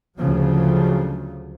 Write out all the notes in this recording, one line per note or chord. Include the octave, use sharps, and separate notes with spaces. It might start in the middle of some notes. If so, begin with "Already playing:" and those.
D2 C#3 F3 F#3